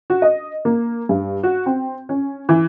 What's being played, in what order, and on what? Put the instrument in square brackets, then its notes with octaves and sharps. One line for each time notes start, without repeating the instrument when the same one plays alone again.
[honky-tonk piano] F#4
D#5
A#3
G2
F#4
C4
C#4
E3